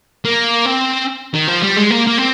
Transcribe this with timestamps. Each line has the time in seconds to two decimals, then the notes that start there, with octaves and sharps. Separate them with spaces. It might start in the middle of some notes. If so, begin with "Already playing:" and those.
0.25 A#3
0.66 C4
1.35 D#3
1.48 F3
1.62 G3
1.77 G#3
1.91 A#3
2.07 A#3
2.18 C4